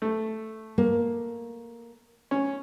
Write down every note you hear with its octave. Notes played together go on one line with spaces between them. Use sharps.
A3
A#3
C#4